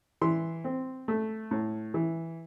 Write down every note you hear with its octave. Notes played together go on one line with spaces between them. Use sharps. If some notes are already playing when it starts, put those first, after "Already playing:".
E3 C6
C4
A3
A2
E3